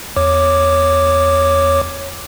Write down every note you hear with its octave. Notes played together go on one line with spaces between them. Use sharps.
E2 C#5 D6